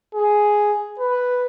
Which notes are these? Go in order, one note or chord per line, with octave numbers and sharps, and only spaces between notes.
G#4
B4